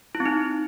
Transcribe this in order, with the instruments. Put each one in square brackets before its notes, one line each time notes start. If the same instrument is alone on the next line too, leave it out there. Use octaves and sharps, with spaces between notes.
[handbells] E4
C4
D#4